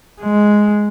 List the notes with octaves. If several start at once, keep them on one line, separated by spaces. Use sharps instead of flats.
G#3